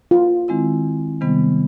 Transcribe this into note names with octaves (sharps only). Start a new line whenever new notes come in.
F4
D#3 G#3 C4 E4
C3 D#3 G3 B3